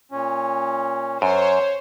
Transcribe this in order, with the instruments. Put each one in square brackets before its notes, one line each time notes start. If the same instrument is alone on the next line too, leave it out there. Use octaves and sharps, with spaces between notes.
[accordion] A#2 C#4
[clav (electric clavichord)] F#2 [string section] C5 C#5